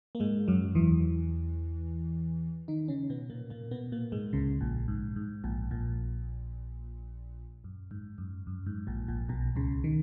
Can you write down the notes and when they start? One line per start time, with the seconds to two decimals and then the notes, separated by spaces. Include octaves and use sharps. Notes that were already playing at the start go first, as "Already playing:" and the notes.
0.15 A#3
0.20 G#2 G#3
0.48 F#2 F#3
0.75 E2 E3
2.68 D#3 D#4
2.88 C#3 C#4
3.10 B2 B3
3.30 A#2 A#3
3.50 A#2 A#3
3.71 B2 B3
3.92 A#2 A#3
4.12 G#2 G#3
4.33 C#2 C#3
4.61 A#1 A#2
4.88 G#2
5.16 G#2
5.44 A#1 A#2
5.71 A#1 A#2
7.64 F#2
7.91 G#2
8.18 F#2
8.47 F#2
8.66 G#2
8.87 A#1 A#2
9.08 A#1 A#2
9.29 B1 B2
9.56 C#2 C#3
9.84 D#3